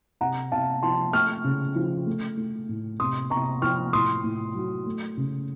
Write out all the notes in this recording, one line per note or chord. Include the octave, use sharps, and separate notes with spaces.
C3 F#5 A#5
C3 F5 A5
F3 A5 C6
A3 C#6 F6
C#3
F3
A3
A3
A2
C3 C6 D#6
C3 A#5 C#6
F3 C#6 F6
A2 C6 D#6
A2
F#3
A3
C#3